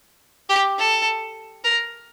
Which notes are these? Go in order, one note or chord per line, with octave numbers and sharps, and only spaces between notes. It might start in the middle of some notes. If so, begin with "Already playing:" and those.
G4
A4
A#4